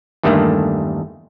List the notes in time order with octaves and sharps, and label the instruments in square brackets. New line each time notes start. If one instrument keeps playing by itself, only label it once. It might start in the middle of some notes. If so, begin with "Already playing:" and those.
[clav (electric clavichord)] E2 G2 D3 D#3 A3 A#3